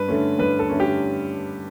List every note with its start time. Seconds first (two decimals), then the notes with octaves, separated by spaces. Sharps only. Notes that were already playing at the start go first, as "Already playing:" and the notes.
Already playing: G2 B4
0.08 D3 A3 C#4
0.39 G2 B4
0.59 A4
0.69 D3 A3 C#4
0.80 G4